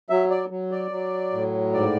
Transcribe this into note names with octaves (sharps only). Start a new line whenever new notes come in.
F#3 E5
D5
F#3
D5
F#3
A2
G#2 D5